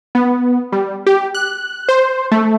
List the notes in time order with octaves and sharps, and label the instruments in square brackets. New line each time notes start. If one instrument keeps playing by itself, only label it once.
[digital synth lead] B3
G3
G4
F#6
C5
A3